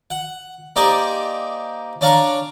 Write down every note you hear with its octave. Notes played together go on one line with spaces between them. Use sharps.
F#5
A#3 D#4 G4 C5 D5 G#5
C#4 D4 D5 F5 A#5 C#6